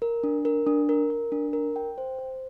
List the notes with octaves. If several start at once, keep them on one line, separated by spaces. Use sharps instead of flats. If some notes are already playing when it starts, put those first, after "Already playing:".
A#4
D4
A#4
D4
A#4
A#4
D4
A#4
G5
C5
C5